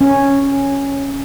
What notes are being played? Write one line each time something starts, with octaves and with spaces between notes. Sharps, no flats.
C#4